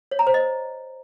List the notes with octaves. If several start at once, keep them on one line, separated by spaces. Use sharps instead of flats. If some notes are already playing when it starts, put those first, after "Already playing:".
C#5
A#5
C5
D#5